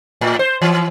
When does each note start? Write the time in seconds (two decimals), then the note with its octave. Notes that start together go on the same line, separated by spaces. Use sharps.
0.21 A2
0.39 C5
0.62 E3